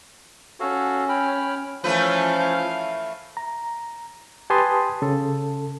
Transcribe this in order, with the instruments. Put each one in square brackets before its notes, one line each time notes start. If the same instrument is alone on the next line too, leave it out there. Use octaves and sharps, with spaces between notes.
[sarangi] C#4 [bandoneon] F#4 A4 F5
[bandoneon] G5 B5 F6
[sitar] E3 A3 B4 [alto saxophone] F3 [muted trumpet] C#4 [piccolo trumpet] F5
[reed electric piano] A#5
G4 B4 G#5 A5 C6 D#6
C#3 A4